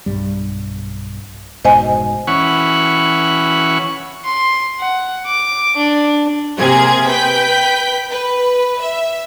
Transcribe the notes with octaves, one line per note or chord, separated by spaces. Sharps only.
B1 G2 G3
F1 G#2 B2 C5 D#5 G#5
E3 C#4 F#5 B5 C#6
C6
F#5
D6
D4
C3 A#3 C4 G#4 G#6
B4 G5 G6 B6
B4
E5